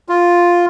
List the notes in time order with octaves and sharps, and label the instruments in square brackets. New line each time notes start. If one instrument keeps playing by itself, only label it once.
[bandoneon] F4